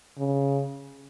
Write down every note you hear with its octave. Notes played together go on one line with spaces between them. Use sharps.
C#3